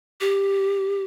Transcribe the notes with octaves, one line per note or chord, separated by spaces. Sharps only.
G4